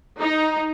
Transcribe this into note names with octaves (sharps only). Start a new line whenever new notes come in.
D#4